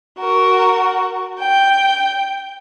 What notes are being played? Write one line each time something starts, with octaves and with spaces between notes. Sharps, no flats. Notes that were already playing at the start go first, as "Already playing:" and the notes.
F#4 A#4
G5